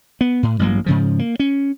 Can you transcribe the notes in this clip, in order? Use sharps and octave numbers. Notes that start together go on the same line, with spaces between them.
B3
A2
A1 G2 F#3 A#3
G#2 C#3 F3
A#3
C#4